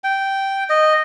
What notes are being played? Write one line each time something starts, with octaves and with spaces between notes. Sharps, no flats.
G5
D#5